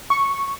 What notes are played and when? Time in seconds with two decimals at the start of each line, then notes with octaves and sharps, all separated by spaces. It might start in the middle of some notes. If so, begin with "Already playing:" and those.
0.10 C#6